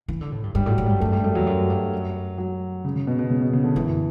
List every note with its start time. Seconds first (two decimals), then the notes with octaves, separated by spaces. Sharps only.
0.08 E3
0.21 D3
0.32 A2
0.44 G2
0.55 G2 G3
0.66 A2
0.70 F#3
0.78 A2
0.86 G2 G3
1.00 F#2 A3
1.12 G2 G3
1.24 F#2 A3
1.35 E2 F#3
1.47 F#2
1.70 G2
1.93 F#2
2.38 F#3
2.85 C#3
2.96 C#3
3.07 B2
3.19 B2
3.30 C#3
3.42 B2
3.53 C#3
3.64 D3
3.76 F#2 E3